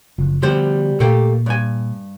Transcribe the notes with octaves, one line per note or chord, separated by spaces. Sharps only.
F#1 F3
D2 D3 F3 G3 B3 C5
A#2 A3 A#3 G4
G2 G#5